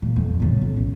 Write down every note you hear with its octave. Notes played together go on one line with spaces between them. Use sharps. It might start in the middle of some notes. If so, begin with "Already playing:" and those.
A#2
F2
A2 C#3
B1
C#4